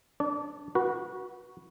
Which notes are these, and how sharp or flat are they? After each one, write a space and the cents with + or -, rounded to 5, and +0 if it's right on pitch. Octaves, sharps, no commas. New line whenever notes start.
D4 +0 D5 -30
F#4 +0 B4 -30